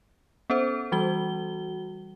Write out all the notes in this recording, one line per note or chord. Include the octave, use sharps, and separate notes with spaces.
B3 C#4 A4 C5
E3 G3 F#4 G7